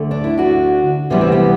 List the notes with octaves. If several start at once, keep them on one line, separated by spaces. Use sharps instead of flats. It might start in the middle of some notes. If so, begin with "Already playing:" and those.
Already playing: D2 D3 A3
D4
E4
D4 F#4
D2 C3 E3 G3 B3
C4
B3